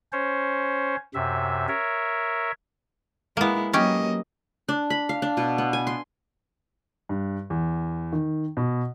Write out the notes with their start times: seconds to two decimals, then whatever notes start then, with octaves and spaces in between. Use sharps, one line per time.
0.13 C#4 C5 C#5
1.14 F#2 C3 E5
1.68 A#4 C#5 E5
3.37 G#3 A#3 B3 E4
3.73 F#3 A#3 C#4 G4 D#5
4.69 D4
4.90 B5
5.09 F5
5.22 D4
5.37 B2
5.58 B3
5.73 G#5
5.87 C6
7.09 G2
7.50 E2
8.12 D#3
8.57 B2